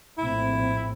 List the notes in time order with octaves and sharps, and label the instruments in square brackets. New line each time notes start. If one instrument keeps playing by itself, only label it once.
[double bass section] A#1 A2 C4 [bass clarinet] E4